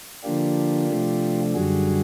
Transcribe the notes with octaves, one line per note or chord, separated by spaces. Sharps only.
D3 F3 A#3 D4 F4 G4
C3 F3 A3 D4
F#2 D3 G3 F#4 G#4